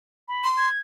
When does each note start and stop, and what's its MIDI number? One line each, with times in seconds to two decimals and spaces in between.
0.28 0.47 83
0.44 0.68 84
0.57 0.79 92